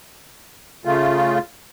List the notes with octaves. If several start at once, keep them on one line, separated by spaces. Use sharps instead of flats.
C#3 A3 F4